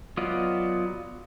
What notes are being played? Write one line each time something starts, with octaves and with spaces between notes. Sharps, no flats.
F#3 B3 F4 D5 D#5